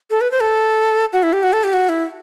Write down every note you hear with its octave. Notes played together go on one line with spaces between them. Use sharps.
A4
B4
C5
A4
F#4
E4
G4
F#4
A4
G4
F#4
E4